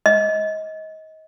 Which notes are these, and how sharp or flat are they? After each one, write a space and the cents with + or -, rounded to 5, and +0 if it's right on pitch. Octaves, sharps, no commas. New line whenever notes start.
D#5 +25